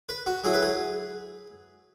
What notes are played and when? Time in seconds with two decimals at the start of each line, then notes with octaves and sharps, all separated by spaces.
0.09 B4
0.26 F#4
0.44 F#3 E4 G#4
0.53 B4
0.62 G#4